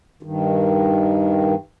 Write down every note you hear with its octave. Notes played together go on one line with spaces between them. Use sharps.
G2 D#3